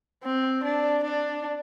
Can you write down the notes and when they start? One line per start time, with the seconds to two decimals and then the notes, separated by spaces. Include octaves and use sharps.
0.23 C4
0.64 D4
1.04 D4